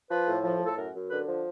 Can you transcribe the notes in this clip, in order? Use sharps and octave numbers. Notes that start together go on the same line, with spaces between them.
F3 B4
A2
F3
A2
A4
F#2 A#4
F#2
D3 B4
F3